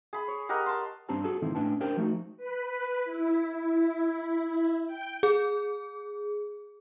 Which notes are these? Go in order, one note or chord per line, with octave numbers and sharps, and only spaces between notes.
G#4 B5
C#5
G4 A#4 D#5 F#5
A5 C6
G2 C4 D4 G4 A5 A#5
F#4 G#4 A4 A5
G#2 B2 D#3 E3 C4 E4
A2 C#4 D4 B4 G5 A5
D4 G4 A#4 C5 G5
F3 A3 D#4 F#4
B4
E4
E4
G5
G#4